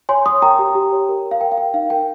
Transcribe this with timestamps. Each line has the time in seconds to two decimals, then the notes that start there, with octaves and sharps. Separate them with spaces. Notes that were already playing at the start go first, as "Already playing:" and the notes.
0.09 C#5 G#5 C6
0.26 C#5 C6 D#6
0.42 A#4 G5 A#5
0.59 G4
0.75 G4
0.92 C#5
1.09 A#4
1.25 A#4
1.31 F5
1.41 A#4 G5
1.52 F5
1.57 A#4 G5
1.74 D#4 F5
1.90 A#4 G5